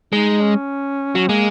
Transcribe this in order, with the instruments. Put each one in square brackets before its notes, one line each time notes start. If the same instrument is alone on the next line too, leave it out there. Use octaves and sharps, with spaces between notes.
[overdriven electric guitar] G#3 [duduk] D#4
[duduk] C#4
[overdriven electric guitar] F#3
[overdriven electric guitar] G#3 [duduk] A#3